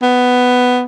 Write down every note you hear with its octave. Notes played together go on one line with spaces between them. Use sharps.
B3